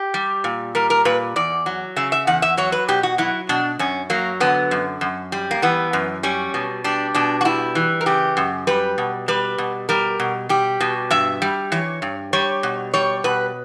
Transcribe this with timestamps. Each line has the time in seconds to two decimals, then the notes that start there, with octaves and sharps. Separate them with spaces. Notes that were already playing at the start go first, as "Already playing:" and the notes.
Already playing: G4
0.14 G3
0.44 A#2
0.75 G3 A#4
0.90 A#4
1.05 A#2 B4
1.36 E2 D5
1.66 F#3
1.96 C#3 E5
2.12 E5
2.27 E2 F#5
2.42 E5
2.57 F#3 C#5
2.72 B4
2.88 B2 G4
3.03 F#4
3.18 F#3 E4
3.49 B2 D4
3.79 F#2 C#4
4.10 F#3 A#3
4.40 D3 B3
4.71 F#2
5.01 F#2
5.32 G3
5.51 A#3
5.62 E3 B3
5.93 F#2
6.23 G3 C#4
6.54 B2
6.84 G3 D4
7.14 B2 D4
7.41 F#4
7.45 G3 E4
7.75 E3
8.01 A#4
8.06 C#3 G4
8.37 F#2
8.67 G3 B4
8.98 B2
9.28 G3 B4
9.58 B2
9.89 G3 A#4
10.20 B2
10.49 G3 G4
10.80 B2
11.10 G2 E5
11.42 G3
11.72 E3 C#5
12.02 G2
12.33 G3 C#5
12.63 B2
12.93 G3 C#5
13.24 B2 B4